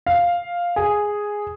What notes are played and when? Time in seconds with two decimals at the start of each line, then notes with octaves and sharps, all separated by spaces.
0.06 F5
0.76 G#4